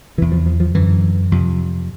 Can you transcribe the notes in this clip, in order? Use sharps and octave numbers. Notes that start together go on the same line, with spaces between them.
E2 C3 E3
F3
F3
F3
F#2 D3 E3
F2 C3